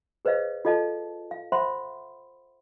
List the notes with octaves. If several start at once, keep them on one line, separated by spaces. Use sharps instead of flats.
G#4 B4 C5 D#5 F5
F4 A4 D#5 F5 A5
F5
C5 E5 F#5 B5 C6